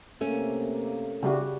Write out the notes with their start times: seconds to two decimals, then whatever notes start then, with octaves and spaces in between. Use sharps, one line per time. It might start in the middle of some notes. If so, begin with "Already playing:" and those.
0.21 C3 A3 A#3 C#4
1.23 C#3 G3 F#4